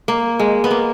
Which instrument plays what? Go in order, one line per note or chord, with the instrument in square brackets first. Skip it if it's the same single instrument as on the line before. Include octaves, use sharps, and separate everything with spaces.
[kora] A#3
G#3
B3
A#3